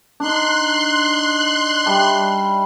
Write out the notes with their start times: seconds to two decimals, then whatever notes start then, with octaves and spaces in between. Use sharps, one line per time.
0.20 D4 D#4 C6 F#6
1.86 G3 E5 A5